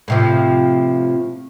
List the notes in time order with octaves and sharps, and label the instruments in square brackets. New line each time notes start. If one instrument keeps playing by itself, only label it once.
[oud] A2 C3 F3